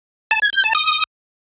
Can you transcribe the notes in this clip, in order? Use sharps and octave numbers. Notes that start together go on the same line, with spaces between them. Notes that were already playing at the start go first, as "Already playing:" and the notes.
A5
G#6
G6
A5
D#6